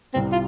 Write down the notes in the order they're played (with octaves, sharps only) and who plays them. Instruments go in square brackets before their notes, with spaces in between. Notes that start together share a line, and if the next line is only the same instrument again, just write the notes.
[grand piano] C2 C3 G3 [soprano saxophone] C4
[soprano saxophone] F4